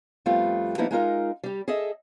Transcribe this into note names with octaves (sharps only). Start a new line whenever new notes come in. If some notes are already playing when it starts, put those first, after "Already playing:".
F2 G3 A3 B3 F4
F3 G3 A#3 B3 D#4 E4
G#3 D#4 F4 A#4
G3 G4
G#4 A4 D#5 E5